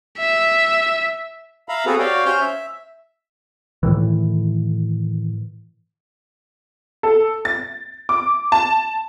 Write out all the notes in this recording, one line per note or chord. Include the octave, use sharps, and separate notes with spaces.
E5
E5 F5 A#5 B5
B3 C4 F#4 G#4 A4 B4
F#4 G4 C#5 D5 F5 G5
C#4 C5 C#5 F6 G6
E5
A2 C3 D#3 E3
A4
A6
D6
A5